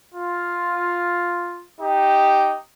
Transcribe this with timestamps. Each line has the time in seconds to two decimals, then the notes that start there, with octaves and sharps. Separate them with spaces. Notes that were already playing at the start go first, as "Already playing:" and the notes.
0.15 F4
1.80 D#4 G4